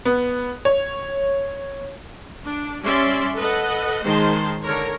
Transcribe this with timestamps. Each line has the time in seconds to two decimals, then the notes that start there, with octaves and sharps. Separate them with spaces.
0.05 B3
0.65 C#5
2.43 D4
2.82 G3 C#4 D5 E5 C6
3.39 A4 B4 D#5 F#5
4.03 D#3 G#3 C5 A5 C6
4.63 D3 A#4 C#5